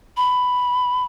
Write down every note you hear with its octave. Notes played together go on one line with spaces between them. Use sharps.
B5